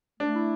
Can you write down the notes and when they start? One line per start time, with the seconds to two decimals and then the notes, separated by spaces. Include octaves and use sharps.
0.20 A3 D4
0.35 E4